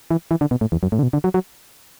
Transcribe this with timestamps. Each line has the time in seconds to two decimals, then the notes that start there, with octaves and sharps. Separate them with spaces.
0.11 E3
0.31 E3
0.41 D3
0.51 B2
0.61 A2
0.72 E2
0.83 F#2
0.92 A2
0.99 D3
1.03 B2
1.13 D3
1.24 F#3
1.34 F#3